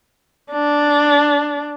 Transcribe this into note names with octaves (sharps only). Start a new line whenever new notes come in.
D4